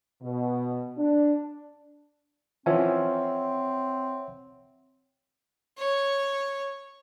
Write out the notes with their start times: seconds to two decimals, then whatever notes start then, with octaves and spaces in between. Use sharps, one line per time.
0.22 B2
0.98 D4
2.66 E3 F3 C4 C#4 C#5 E5 F#5
5.78 C#5